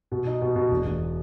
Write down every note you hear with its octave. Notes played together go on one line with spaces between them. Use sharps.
B2
D#4
B2
B2
E1
E1